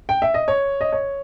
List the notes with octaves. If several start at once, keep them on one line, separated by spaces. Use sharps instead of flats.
G5
E5
D#5
C#5
D#5
C#5